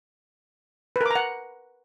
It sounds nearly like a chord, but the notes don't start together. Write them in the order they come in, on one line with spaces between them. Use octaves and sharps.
B4 A#4 D6 A#5 F#5